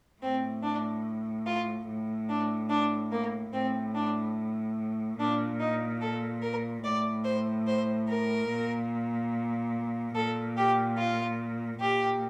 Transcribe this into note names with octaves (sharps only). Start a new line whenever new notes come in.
A2 C4
D4
F4
A2
D4
D4
A#3
A2 C4
D4
A#2 D4
D#4
A4
A#4
A2 D5
C5
C5
A#4
A#2
A#2 A4
G4
F4
A#2 G4